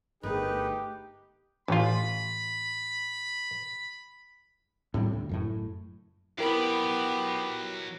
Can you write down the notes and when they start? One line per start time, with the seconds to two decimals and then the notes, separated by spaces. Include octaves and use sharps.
0.23 G1 A3 D#4 G4 G#4 A#4 B4
1.68 A1 F4 B5
4.94 A2 C3 G3
5.13 D2
5.29 F#1 F#2 A2
6.38 F#3 B3 E4 G4 A#4 B5